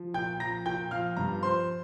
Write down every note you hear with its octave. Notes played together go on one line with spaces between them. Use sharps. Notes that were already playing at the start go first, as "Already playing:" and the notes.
Already playing: F3
A#2 G5 G6
F3 A#5 A#6
A#2 G5 G6
F3 F5 F6
G2 A#5
F3 C5 C6